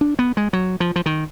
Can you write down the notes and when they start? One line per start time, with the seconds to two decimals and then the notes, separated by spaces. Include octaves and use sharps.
0.01 D4
0.19 B3
0.37 G#3
0.53 F#3
0.80 F3
0.96 F3
1.06 D#3